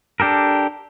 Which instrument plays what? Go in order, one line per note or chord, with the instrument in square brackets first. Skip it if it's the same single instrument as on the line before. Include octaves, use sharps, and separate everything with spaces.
[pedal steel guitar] D4 G4 A4 A#4